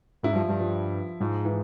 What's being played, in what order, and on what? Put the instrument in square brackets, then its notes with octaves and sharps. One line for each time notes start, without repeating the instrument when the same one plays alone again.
[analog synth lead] G#2 [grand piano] E4
[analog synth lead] G2 [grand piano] F3
[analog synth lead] G2 [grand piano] F3
[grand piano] F3
[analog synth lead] G#2 [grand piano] F3
[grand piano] E3